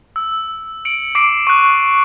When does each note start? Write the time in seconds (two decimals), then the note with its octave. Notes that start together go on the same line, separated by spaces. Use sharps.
0.16 E6
0.85 C#7 D7 F#7
1.15 D6 C7 D7
1.47 C#6 D6 F#6